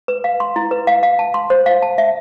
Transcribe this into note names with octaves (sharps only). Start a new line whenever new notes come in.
B4
F5
C6
E4
B4
F5
F5
A5
C6
C5
F5
A5
E5